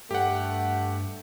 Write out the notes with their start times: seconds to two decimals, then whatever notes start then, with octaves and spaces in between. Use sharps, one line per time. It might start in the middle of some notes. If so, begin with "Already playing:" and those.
0.11 G2 A3 G4 F#5